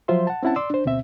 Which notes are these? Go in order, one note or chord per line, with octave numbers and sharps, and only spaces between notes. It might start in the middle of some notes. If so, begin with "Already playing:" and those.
F3 F#3 F4 C5 E5 C6
F#5 A5
C4 C#4 E4 F#5 A5
D5 C6 D6 E6
D4 C5
D2 B2 C4 E5